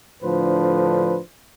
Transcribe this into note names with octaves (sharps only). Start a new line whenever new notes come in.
A2 D3 F3 D4 B4 C5